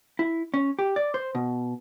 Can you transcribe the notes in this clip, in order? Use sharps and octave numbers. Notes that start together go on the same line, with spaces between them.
E4
C#4
G4
D5
C5
B2